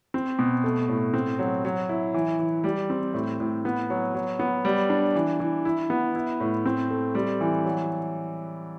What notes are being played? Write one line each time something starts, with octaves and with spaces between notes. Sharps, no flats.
C4
B2
A3
A2
C4
F#3
F#3
E4
E3
E3
G3
C4
A2
A2
B3
F#3
F#3
B3
G3
D4
E3
E3
E4
B3
E4
A2
C4
A3
G3
E3
F#3